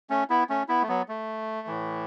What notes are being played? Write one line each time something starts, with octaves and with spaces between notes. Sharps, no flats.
A3 C#4
B3 E4
A3 C#4
B3 E4
A3
F#3 B3
A3
A2 E3